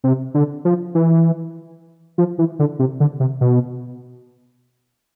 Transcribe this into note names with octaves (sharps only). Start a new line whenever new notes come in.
C3
D3
F3
E3
F3
E3
D3
C3
D3
C3
B2